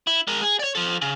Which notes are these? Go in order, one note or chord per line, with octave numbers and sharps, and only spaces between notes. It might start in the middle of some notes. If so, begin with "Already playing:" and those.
E4
G#3 A#4
G#4
C#5 D5
F3 A4
C#3